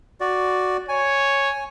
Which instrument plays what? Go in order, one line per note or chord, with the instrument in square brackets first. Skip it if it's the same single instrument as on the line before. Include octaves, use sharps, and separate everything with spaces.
[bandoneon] F#4 D5
[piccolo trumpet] C#5 [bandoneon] G#5